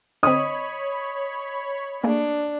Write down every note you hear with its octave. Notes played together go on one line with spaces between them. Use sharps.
D3 C4 C#5 D#5 B5 D#6
A3 A#3 D4 G#4